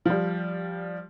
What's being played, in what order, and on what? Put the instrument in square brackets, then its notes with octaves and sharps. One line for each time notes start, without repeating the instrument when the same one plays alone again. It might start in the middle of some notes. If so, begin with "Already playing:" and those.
[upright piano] F3 G3